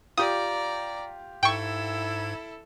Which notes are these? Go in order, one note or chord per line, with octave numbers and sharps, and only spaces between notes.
F4 G4 D5 A#5 D#6
G#2 E4 A4 G5 C#6 G#6